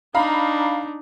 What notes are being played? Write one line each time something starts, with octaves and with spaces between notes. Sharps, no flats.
D4 D#4 F5 A#5 B5